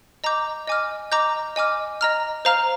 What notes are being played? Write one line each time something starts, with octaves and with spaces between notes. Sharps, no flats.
D#5 A#5 D6 G6
D#5 G#5 D6 F6
D#5 A#5 D6 G6
D#5 G#5 D6 F6
D#5 A#5 F6
C5 F5 A#5 F6